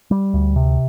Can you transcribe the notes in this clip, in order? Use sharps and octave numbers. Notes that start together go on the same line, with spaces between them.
G3
D2
C3